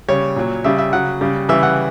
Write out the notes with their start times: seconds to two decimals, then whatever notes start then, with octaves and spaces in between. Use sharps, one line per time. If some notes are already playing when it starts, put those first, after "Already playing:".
0.08 C#3 G3 C#5
0.36 A#2 F#3
0.64 C#3 G3 E5
0.78 E5
0.93 C#3 F#3 F#5
1.21 C#3 G3
1.49 C#3 E3 G3 E5
1.63 F#5